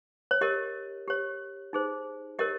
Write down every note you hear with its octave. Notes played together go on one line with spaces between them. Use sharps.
C#5
G4 A#4 C#5 D#5
G4 C#5
D#4 G#4 C5
G4 A#4 C#5 D#5